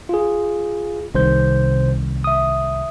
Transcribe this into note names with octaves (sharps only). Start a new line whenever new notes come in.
F4 G#4
C2 C3 D#3 C5 G6
E5 D#6